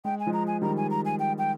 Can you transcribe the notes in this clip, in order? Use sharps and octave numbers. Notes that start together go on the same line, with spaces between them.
G#3 G5
G#5
F3 G#3
A#5
G#5
D#3 G3 A#5
G#5
A#5
G#5
G5
G5